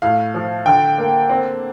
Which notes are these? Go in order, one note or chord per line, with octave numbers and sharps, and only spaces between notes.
A2 F5
F3
D3 G5
A#3
C4